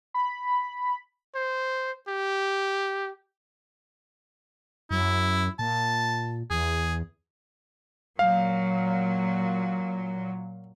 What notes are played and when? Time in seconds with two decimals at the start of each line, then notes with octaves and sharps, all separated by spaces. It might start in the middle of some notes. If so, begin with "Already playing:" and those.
0.14 B5
1.35 C5
2.08 G4
4.91 F#2 E4
5.59 A#2 A5
6.51 E2 G#4
8.19 A#2 F#3 F5